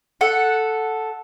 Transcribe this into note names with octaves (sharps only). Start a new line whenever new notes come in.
A4 F#5